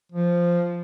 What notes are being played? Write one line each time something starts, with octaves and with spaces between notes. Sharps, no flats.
F3